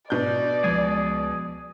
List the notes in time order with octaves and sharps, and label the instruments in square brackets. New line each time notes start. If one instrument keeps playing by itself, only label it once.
[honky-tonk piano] B2 G6 [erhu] D5
[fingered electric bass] C#2 F3 G#3 [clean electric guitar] G#4